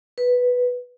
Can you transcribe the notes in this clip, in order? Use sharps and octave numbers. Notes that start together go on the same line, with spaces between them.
B4